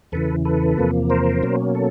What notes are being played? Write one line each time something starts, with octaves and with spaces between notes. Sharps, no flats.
E2 C#3 E3 A4 B4
A4 B4
E2 C3 F3 A#3
A#4 C5
B2 F#3 A#3 C#4
A4